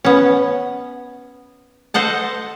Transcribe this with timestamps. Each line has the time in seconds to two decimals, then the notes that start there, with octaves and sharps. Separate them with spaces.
0.05 B3 C#4
1.94 A4 C5 D#5 F#5 A5